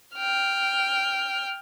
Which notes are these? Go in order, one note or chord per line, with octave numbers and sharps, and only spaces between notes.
G5 F6